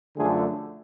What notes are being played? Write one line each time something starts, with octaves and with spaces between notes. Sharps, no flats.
F#2 D3 F3 A3 G#4